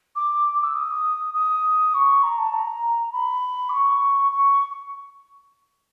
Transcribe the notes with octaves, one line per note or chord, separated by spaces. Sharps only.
D6
E6
D#6
D#6
C#6
A#5
A5
A#5
B5
D6
C#6
C#6